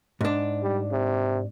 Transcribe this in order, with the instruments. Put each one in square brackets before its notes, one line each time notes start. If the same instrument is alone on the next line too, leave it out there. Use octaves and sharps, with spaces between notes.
[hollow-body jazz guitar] G#2 D4
[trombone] G3
C3